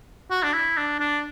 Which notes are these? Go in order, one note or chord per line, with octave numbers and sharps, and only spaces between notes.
F#4
D4
E4
D4
D4